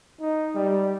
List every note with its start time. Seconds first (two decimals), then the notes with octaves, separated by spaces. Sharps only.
0.21 D#4
0.55 G3